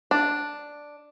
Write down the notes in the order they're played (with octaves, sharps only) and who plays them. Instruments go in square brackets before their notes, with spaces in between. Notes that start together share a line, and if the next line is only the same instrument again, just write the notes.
[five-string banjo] D4